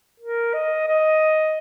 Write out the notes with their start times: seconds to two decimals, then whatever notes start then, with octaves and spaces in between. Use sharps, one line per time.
0.20 A#4
0.54 D#5
0.88 D#5